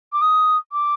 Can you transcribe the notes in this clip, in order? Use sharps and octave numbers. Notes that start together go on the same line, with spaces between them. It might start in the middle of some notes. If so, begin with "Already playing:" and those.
D6
D#6
D6